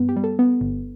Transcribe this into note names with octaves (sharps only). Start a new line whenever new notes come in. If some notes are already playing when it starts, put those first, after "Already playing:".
Already playing: G2 B3
G4
G3
A4
B3
G1